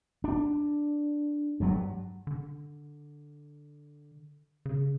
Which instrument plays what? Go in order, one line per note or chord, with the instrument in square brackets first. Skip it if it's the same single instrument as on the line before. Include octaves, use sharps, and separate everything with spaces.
[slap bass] D4
G2 F#3
[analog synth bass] D3
C#3